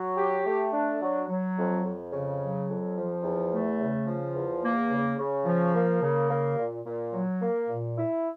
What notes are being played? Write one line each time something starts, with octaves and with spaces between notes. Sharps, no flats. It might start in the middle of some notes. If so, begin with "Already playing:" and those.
Already playing: F#3
G4
A3
D4
F#3
F#3
F2
F2
C#3
F#3
F2
F3
E2
A3
C#3
F3
E2
A#3
C#3
C#3
F3
A#3
C#3
A#3
A#2
A#2
F#3
A#3
A#2
E4